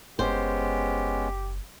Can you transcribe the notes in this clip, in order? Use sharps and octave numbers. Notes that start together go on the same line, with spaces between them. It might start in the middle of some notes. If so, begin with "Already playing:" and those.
F#1 G#3 B3 C#4 G4 C5